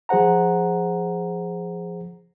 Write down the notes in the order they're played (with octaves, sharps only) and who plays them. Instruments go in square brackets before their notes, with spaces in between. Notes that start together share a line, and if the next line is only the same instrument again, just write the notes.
[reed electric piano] F3 G#4 C5 F#5 A#5